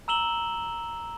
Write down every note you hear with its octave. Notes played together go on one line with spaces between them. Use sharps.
A#5 E6 E7 F#7 G7